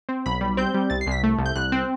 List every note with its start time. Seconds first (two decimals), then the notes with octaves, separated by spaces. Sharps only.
0.09 C4
0.26 B1 B5
0.41 G3
0.57 C4 G6
0.74 G3
0.90 C2 A6
1.01 C7
1.07 C2 B6
1.23 A3
1.39 C2
1.46 G6
1.56 C2 F#6
1.72 C4